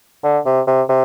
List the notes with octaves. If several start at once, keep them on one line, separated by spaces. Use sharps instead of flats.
D3
C3
C3
C3